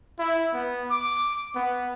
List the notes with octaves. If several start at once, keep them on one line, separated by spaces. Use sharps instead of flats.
E4
B3
D6
B3